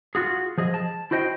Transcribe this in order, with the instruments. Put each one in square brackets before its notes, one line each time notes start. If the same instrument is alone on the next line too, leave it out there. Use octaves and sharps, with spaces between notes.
[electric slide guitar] F4 F#4 G#4
F3 G#4 D#5
A5
E4 F#4 C5 D#5 F#5 G5